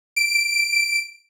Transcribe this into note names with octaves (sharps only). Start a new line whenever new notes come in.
D7